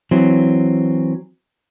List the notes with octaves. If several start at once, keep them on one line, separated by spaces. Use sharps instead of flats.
E3 F#3 C4